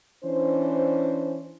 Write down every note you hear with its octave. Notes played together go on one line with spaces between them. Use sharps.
E3 C#4 D4 C5